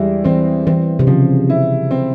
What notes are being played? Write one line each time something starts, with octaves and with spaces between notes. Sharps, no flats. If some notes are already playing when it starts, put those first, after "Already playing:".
Already playing: E2 G3 G#3 E4
E3 C4
E3 C4
C3
C#3 F3
E4
C4